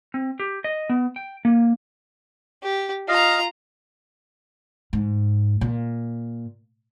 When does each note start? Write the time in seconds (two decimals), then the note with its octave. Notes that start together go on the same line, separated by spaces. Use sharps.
0.14 C4
0.40 G4
0.64 D#5
0.90 B3
1.16 G5
1.45 A#3
2.63 G4
3.08 F4 D#5 F5 A#5
4.93 G#2
5.61 A#2